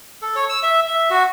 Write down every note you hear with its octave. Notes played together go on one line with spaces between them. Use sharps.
A4
C#5
E6
E5
E5
F#4